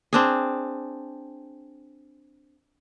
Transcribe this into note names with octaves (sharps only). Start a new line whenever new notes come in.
C4 D4 G#4